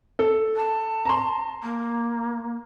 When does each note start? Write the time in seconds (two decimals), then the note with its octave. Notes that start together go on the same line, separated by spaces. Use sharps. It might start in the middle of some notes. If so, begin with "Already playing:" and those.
0.19 A4
0.56 A5
1.05 A#5 C6
1.63 A#3